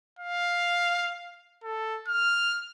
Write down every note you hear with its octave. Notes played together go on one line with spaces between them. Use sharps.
F5
A4
F6